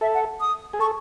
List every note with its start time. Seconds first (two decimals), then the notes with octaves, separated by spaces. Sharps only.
0.01 A4 E5
0.14 F#5
0.41 D#6
0.73 G#4
0.79 A4 C#6